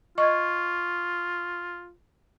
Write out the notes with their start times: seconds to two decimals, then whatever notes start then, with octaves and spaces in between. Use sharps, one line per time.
0.18 F4 D#5 C#6 G#6